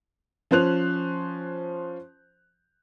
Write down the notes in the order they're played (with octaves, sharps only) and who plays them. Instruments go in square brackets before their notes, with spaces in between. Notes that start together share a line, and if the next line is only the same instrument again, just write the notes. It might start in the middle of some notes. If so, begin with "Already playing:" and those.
[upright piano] F3 C#4 C5 F#6 F7